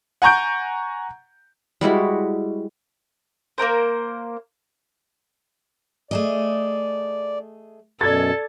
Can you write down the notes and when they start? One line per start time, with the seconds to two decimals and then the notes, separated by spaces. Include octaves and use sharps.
0.22 F#5 G#5 A#5 C#6 G6 D7
1.81 G3 G#3 E4 F#4
3.58 A#3 D4 A#4 C5
6.11 A3 G#4 D5 D#5
8.01 F#2 B2 A4 D5 G#6 A6